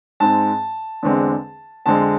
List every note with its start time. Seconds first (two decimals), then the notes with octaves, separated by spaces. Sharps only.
0.20 G#2 G#3 C4 A5
1.03 E2 D3 G#3 C4
1.86 F2 D3 G#3 C4 A5